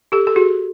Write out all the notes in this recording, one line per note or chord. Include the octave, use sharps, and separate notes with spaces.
G4 A4
A4
F#4 G#4